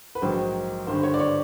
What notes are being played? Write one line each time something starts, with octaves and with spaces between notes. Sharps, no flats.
B4
A#1 G#2 D#3 F#3 C5
G#1 G2 D3 C5
C#5
D5
C#5